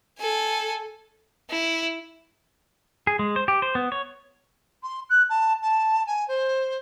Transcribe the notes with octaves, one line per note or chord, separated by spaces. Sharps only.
A4 G#5
E4
G#4
G#3
C5
G4
C5
B3
C#5
C6
F#6
A5
A5
G#5
C5